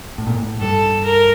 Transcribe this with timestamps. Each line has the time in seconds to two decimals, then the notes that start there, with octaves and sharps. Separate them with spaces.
0.18 A2
0.27 A#2
0.36 A2
0.61 G2 A4
1.04 A#4